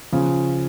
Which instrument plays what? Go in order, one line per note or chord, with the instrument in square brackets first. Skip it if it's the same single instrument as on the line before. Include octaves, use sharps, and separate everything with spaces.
[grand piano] C#3 F3